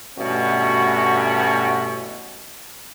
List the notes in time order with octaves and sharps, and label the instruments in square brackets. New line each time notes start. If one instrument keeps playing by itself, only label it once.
[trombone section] G2 B2 E3 A3 C#4 F#4